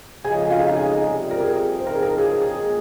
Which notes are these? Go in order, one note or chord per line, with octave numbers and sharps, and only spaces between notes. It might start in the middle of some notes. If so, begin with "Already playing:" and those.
F2 C#3 G#3 D#4 G#4 G#5
F4 F5
G#4 G#5
F2 C3 G3
A#4
G#4
C#3 F3 C4 D#4 C5
A#4
G#4
A#4
G#4
G#4
A#2 G#3 C#4